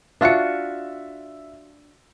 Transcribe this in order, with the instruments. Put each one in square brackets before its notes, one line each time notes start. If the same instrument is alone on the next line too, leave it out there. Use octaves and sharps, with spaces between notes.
[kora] D4 F4 F#4 [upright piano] E5 C#7